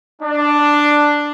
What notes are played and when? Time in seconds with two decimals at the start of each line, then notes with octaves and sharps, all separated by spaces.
0.22 D4